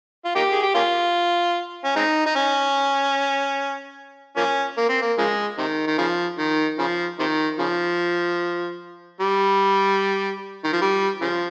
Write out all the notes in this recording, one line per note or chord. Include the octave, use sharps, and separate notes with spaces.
F4
A#3 D#4 G4
G#4
G4
A#3 C#4 F4
C#4
G#3 C4 D#4
D#4
C#4
F3 A#3 C#4
A#3
C4
A#3
C#3 F3 G#3
C3 D#3
D#3
C#3 F3
D#3
C#3 F3
C3 D#3
C#3 F3
G3
D#3
F3
G3
C#3 F3